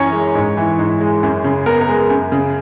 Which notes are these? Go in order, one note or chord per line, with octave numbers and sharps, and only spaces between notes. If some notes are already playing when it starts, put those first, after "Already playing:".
Already playing: F#2 E3 C#4 C#5 G#5 A#5
G#3
G#2
E3
G#2
G#3
F#2
C#3
B3 A#4
A#4
G#3
F#2
C#3